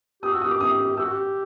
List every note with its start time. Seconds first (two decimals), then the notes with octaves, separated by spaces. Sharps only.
0.23 G4 D#6
0.32 F#4 E6
0.41 D#6
0.45 G4
0.51 D6
0.61 D#6
0.96 G4 E6
1.04 F#4
1.12 G4